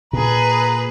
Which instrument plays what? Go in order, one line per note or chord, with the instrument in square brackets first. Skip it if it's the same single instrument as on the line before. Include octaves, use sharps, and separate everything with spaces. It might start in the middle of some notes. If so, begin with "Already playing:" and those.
[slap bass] A#2 [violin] G#4 B4 [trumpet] A#5